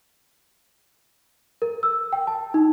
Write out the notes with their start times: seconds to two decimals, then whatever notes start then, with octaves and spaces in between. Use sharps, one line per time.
1.62 A#4
1.83 E6
2.13 G5
2.27 A5
2.54 D#4